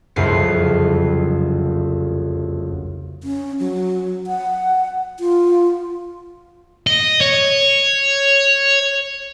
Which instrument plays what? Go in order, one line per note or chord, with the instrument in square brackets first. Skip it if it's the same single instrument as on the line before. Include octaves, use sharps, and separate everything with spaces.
[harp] F#1 C2 F2 C7
[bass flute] C#4
F#3
F#5
F4
[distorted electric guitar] D#5
C#5